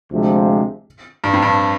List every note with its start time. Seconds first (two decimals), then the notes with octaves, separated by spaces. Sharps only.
0.11 D2 C3 F3 G#3
1.24 G2
1.33 F2
1.42 G2